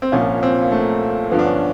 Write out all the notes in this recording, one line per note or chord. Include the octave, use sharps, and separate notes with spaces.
C4
C2 A#2 F3 C#4
C4
A#3
A3
G2 D3 F3 B3
D4
C#4